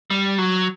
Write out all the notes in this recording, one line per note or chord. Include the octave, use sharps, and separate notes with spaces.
G3
F#3